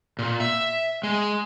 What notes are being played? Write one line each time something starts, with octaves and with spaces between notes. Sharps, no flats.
A#2
E5
G#3